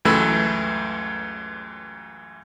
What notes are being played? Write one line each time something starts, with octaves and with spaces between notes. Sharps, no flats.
C#2 F#2 E3 A3 B5 E6